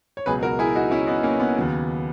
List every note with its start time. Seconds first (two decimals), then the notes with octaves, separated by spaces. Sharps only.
0.17 C#5
0.26 C#2 B2 F#3 G#4 B4
0.43 F#4 A#4
0.59 E4 G#4
0.75 D#4 F#4
0.91 C#4 E4
1.07 B3 D#4
1.23 A#3 C#4
1.40 B3
1.57 D#2 C#3 F#3